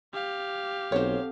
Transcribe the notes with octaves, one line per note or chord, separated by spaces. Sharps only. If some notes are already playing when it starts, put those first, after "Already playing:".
G4 F5
B1 C4 A4 C5 C#5